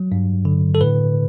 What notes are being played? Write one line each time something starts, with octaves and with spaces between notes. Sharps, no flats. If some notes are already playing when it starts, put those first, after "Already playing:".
Already playing: F#3
G2
D3
A4
A2 B4